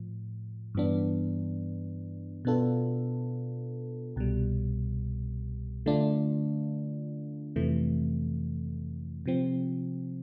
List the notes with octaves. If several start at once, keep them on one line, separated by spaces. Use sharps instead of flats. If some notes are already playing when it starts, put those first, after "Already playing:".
Already playing: A2 F3
G2 E3 B3 D4
B2 B3 D4 F4 A4
C2 B2 G3
D3 A3 D4 F4
F2 C3 E3 A3
C3 F3 C4